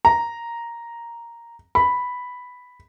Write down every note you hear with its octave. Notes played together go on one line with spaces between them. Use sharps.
A#5
B5